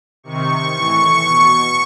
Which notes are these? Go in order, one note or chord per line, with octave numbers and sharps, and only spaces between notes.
C3 D#3 C#6
A2 E3 C#6
B2